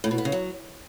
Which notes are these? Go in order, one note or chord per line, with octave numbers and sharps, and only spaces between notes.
A2
B2
B3
C#3
F#3